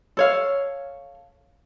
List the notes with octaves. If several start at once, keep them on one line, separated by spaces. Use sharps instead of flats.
A4 C#5 F5